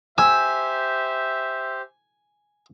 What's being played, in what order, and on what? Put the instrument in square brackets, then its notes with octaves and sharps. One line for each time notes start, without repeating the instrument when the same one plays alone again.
[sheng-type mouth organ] G4 C5 [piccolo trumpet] E5 [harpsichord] G#5 [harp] E6